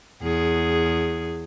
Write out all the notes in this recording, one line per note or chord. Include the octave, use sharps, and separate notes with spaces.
E2 G#4